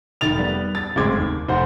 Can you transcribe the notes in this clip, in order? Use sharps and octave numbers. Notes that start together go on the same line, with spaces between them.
F1 D#3 A6 F7
G3 B3
A6
F#1 A2 G#3 C4 D6 G#6
D#2
F1 C5 F#5